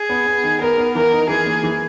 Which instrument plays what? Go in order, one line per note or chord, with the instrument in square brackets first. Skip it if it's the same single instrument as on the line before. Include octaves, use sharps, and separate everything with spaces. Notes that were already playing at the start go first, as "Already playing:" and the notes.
Already playing: [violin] G#4
[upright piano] B3
B3
D#3
[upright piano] B3 [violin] A#4
[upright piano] B3
[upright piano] E3 [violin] A#4
[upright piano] D#4
[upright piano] E3 [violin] G#4
[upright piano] A#3
E3